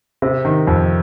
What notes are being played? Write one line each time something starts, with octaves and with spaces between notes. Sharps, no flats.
C3
D#3
F2